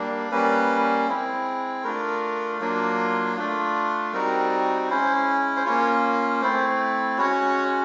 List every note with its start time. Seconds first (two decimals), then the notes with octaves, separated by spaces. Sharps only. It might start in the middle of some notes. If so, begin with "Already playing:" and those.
Already playing: G3 A#3 D4
0.31 G3 A#3 C#4 B4
1.07 G#3 C4 E4
1.84 A3 D4 F4 A#4
2.60 F#3 A#3 D4 F4
3.36 A3 D4 F4
4.12 G3 C4 D#4 F#4 A#4
4.90 G#3 C#4 E4 C5
5.56 C5
5.65 A#3 C#4 F4 C#5
6.42 A3 C4 E4 C5
7.18 G#3 C#4 F#4 C#5